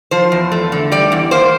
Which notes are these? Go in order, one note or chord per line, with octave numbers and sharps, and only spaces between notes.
F3 C5
E2
A3
D3
G3 D5
E2
A#3 C5